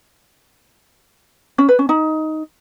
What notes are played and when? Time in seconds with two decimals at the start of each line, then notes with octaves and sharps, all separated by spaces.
1.58 C#4
1.69 B4
1.79 C#4
1.89 D#4